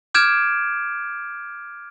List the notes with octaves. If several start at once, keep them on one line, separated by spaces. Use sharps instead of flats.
D6 F6 G6 G#6 D7 E7